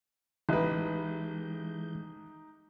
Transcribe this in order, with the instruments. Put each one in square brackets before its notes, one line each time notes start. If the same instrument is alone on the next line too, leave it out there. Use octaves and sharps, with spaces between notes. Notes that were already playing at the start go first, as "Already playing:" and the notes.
[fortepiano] A1 B4 [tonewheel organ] E3 G#3 G6 [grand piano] D#4 G4